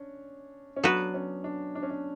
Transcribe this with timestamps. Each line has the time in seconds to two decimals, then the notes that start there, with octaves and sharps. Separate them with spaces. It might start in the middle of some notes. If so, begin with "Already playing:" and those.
Already playing: C#4 D4
0.76 C#4
0.84 F#3 B3 D4 F#4 B4
1.14 C#4
1.44 D4
1.75 D4
1.83 C#4
1.90 D4